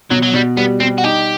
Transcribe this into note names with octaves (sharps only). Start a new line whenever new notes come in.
B2 F#3
F#3
B2 G3
G3 B3
G3 C4
F#4
D#4 G4